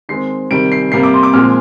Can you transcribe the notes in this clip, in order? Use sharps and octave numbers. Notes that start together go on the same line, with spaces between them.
D#3 G#3 C4 C7
C3 D#3 G3 D7
C7
C3 G3 A#3 C7
D6
C6
D6
A#2 F3 G#3 C4 F6